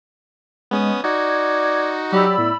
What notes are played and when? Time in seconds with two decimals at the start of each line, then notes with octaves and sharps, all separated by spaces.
0.71 G#3 B3 C#4 D#6
1.04 D#4 F#4 D5 G#6
2.12 F#3 G4 D5 B5 E6
2.38 A2 B3